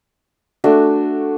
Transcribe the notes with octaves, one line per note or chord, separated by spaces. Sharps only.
A3 D4 F#4